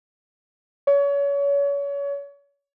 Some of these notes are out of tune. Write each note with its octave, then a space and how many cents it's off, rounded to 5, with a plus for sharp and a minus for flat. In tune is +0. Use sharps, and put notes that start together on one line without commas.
C#5 +30